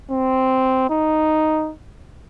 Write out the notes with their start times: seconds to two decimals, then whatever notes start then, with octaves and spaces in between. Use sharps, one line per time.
0.11 C4
0.90 D#4